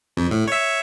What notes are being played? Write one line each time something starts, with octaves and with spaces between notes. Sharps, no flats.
F2
A2
C#5 E5